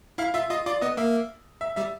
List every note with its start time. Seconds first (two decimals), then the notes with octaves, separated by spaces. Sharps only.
0.18 E4 F5
0.34 F4 E5
0.50 F4 D#5
0.66 F4 D5
0.81 B3 D#5
0.97 A#3 E5
1.61 E5
1.76 G3 E5